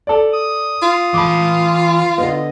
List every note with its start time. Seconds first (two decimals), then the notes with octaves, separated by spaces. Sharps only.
0.07 A4 D5
0.33 D#6
0.82 F4
1.14 E3 A5 B5 D6
2.18 D3 B3 D#5